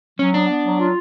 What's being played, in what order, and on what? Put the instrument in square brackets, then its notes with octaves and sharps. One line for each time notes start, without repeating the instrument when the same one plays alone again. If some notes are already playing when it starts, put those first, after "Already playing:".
[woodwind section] F#3 [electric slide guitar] C#4
[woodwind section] B3 [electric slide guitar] D4
[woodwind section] B3
F#3
F4